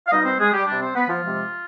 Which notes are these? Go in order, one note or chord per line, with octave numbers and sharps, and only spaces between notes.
F5
B2 G3 D#4 D#5
C4 C5
G#3 G#4
G3 G4
C3 G3 D4
C4 C5
B3 B4
F3 F4
C3 F3 G#3